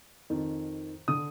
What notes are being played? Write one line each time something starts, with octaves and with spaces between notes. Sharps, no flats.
F2 D#3
D3 D#6